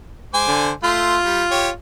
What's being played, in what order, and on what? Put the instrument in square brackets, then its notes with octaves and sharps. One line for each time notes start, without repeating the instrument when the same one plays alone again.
[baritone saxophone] G#3 [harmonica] C5 G#5 D6
[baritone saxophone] D3
[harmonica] A3 C6 [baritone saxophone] F4
[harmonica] G3
G4 C#5